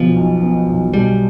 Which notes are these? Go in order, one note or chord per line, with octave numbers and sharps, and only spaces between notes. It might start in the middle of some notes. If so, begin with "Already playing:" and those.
Already playing: B1 B2 F3 B3
B1
B3
B1
B2 G3